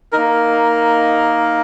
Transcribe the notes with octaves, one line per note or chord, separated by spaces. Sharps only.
A#3 D#4 A#4